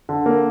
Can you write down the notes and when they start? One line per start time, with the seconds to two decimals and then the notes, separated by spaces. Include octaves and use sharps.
0.09 D3
0.26 A#3